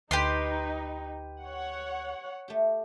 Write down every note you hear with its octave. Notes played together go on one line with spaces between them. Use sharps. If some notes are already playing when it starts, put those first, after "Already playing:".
D2 D#4 G4 B4 C6
C#5 F#5
A3 G4